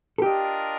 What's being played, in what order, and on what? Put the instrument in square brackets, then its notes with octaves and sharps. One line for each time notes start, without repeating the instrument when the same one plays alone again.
[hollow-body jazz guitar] A4
[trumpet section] D4 F4 A#4 D#5 [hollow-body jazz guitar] G4